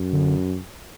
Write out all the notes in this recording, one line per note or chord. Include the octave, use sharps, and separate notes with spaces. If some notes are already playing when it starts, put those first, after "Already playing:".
Already playing: F#2
D3